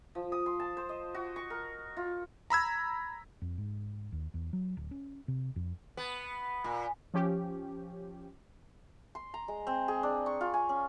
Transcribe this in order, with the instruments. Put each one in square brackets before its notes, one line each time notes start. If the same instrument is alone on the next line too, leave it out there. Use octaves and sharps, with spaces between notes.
[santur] F3
D#6
C6
A5
C5
D#5
F#4
C#6
A#4
F4
[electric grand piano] A#5 B5 E6 G#6
[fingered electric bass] F2
G#2
D#2
E2
F#3
D1
C#4
C3
F2
[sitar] B3
A#2
[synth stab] F3 C#4 G4
[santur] C6
A#5
G#3
C4
G#4
D4
C#6
F4
G#5
C#4